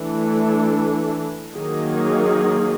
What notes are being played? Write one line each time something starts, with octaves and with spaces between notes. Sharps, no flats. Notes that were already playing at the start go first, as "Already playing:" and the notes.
Already playing: E3 A3 D4
D#3 F#3 A#3 D#4 G#4